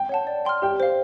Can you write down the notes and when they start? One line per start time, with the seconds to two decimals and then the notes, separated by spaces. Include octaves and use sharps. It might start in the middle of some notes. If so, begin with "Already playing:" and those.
Already playing: G5
0.09 C#5 F#5 A5
0.27 D5
0.45 G5 C6 F6
0.62 G4 G5
0.80 C5 F5